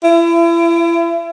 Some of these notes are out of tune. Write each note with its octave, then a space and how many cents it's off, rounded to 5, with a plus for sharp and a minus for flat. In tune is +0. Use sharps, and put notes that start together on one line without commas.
E4 +35